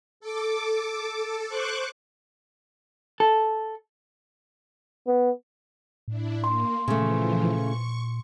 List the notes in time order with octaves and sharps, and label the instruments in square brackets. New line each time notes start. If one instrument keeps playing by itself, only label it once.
[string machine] A4 D6
A4
C5 C#6 D6 F#6
[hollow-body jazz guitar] A4
[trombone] B3
[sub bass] A2 [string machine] D4 E4
[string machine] A#3 [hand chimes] C6
[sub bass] A#2 [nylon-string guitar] C#3 A3 [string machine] E3 F3
[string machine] C#6